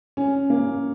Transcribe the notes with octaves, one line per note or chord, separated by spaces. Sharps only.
C#4
A#3